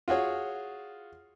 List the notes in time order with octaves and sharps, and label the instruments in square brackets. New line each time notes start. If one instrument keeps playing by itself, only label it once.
[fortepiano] F4 F#4 G#4 C#5